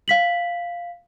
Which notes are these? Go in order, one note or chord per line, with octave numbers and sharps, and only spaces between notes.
F5 B6 F#7